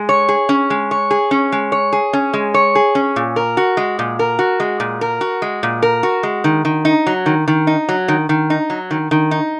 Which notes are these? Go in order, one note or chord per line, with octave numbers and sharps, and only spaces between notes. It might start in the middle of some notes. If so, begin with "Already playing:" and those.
Already playing: G#3
C#5
G#4
C#4
G#3
C#5
G#4
C#4
G#3
C#5
G#4
C#4
G#3
C#5
G#4
C#4
A#2
A#4
F#4
G#3
A#2
A#4
F#4
G#3
A#2
A#4
F#4
G#3
A#2
A#4
F#4
G#3
D#3
D#3
D#4
F#3
D#3
D#3
D#4
F#3
D#3
D#3
D#4
F#3
D#3
D#3
D#4